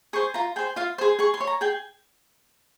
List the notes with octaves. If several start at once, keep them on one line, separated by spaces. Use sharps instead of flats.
G#4 C5 C#6
F4 A#5
G#4 C5 G5
F4 F5
G#4 C5 C6
G#4 C#6
C6
C#5
A#5
G#4 G5